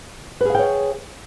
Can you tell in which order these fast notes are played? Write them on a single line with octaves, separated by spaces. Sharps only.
B4 G#4 F5 G5 C#5